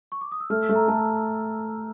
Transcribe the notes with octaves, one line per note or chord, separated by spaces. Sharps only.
C#6
D6
D#6
E6
A3 F6
E6
A3
A#5
A3 A5